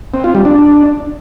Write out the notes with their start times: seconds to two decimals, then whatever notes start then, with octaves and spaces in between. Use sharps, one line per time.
0.14 C4
0.24 F4
0.35 G3
0.45 D4